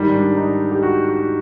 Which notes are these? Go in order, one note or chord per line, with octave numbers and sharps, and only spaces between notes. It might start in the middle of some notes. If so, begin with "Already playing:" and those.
Already playing: G#2 D#3 G3
D4
D#4
G4
F#4
F#4